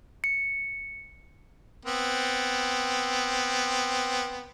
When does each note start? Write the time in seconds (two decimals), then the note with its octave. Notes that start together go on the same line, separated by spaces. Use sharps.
0.24 C#7
1.85 B3 C4